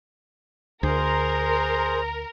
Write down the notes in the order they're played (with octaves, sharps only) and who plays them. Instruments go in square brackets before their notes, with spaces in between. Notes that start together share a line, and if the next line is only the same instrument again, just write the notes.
[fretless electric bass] D2 [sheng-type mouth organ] G#4 C5 C6 [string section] A#4